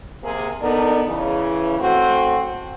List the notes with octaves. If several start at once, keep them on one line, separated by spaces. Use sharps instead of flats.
C3 A#3 G#4
B3 D4 D#4 A4 A#4 D5
C#3 E3
A3 C4 F#4